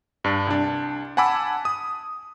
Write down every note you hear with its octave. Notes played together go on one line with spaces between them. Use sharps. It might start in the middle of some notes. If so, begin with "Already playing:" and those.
G2 D4
C2 D4
F#5 G#5 A5 B5 D6 E6
D#6